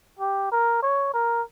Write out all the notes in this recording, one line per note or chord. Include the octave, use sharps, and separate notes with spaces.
G4
A#4
C#5
A#4